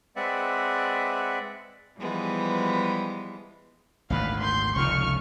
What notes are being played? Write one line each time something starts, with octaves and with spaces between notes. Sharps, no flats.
G#3 C4 B4 D5 E5 F#5
E3 F3 G3 G#3 B3
G#1 D2 A#2 B4 F5
C6 G6
F1 C#2 C#3 C#6 F6